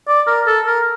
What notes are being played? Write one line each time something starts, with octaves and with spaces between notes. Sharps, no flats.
D5
A#4
A4
A#4